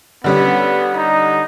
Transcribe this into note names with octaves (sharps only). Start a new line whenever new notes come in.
D3 G3 B3 C#4
D#4